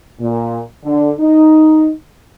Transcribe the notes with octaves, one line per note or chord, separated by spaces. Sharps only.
A#2
D3
D#4